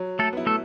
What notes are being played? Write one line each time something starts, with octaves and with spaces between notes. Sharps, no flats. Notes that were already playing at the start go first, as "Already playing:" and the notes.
Already playing: F#3
A3 A4
B3 E4
A3 A4